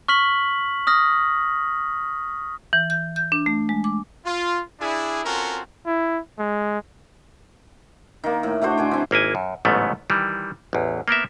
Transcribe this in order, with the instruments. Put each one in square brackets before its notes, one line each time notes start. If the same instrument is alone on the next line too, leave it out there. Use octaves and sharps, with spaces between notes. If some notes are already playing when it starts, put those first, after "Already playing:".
[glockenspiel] C#6 F6 B6 F#7
D#6 F6 A#6
[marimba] E3
G6
G6
D4
A3
G#3
D6
[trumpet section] F4
D4 E4 G#4
C4 C#4 F4 F#4 A4 A#4
[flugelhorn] E4
G#3
[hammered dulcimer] D#3 A#3
A2
A3 D4 F#4 C5
D3 G#5 D6
E3 C4
[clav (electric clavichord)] G#1 A#3 E4 G#5
F#2
A1 G#2 C#3 F#3 A3 B3
D#3 E3 G3
A1 E2
A#3 B3 A#4 E5